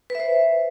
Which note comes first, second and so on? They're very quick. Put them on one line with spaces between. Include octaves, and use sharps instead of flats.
B4 E5 C5